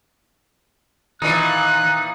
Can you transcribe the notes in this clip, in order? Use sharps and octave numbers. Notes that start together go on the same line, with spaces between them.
A#2 D#3 E3 D#4 F#6